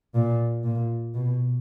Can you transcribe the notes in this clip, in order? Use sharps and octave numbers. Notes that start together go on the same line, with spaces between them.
A#2
A#2
B2